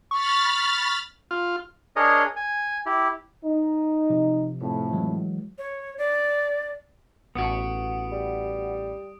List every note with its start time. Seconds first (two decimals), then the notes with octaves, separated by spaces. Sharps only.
0.11 B5 C#6 F6 A6
1.31 F4
1.96 D4 G#4 A#4 C#5 D#5
2.36 G#5
2.86 E4 G4
3.44 D#4
4.10 C3 F3
4.61 F2 A2
4.92 E3 F#3 G#3
5.58 C#5
5.98 D5
7.35 A1 B3 F#4 D#6 D7
8.12 G3